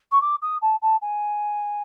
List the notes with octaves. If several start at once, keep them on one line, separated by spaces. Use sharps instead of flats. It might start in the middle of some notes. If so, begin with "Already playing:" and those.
C#6
D6
D#6
A5
A5
G#5